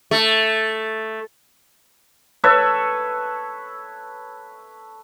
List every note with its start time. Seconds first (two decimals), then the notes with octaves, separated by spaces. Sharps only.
0.11 A3
2.44 A4 B4 C#5 E5